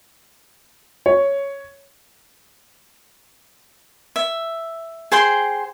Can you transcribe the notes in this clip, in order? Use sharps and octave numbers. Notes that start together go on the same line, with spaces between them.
C#5
E5
G#4 C5 G5 C6